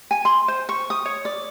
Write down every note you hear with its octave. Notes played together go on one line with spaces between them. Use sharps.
G#5
C6
C5
C#6
D#6
C#5
D5